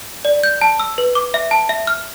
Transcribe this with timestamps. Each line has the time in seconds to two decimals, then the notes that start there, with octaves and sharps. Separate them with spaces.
0.25 D5
0.43 G6
0.61 A5
0.80 E6
0.98 B4
1.15 D6
1.34 E5
1.51 A5
1.69 E5
1.87 F6